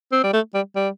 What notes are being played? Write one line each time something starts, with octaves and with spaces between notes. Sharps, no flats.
C4
G3
A3
G3
G3